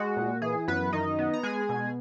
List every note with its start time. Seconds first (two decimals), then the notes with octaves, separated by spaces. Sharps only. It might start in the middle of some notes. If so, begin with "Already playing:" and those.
Already playing: G#3 F#4
0.17 A#2
0.42 E3 G#4
0.68 F#2 B3 B4
0.93 D#3 D#4 D#5
1.19 B3
1.34 A#5
1.43 G#3 G#4 G#5
1.69 B2